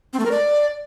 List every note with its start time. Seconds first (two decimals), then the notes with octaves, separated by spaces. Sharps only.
0.13 C4
0.19 A3
0.25 A#4
0.31 D5